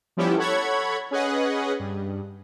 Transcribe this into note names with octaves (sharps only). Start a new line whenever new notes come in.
F3 G3 B3 C#4 E4 G4
A4 C#5 F#5 B5 C#6 G#6
C#4 G#4 B4 D#5 F#5
G2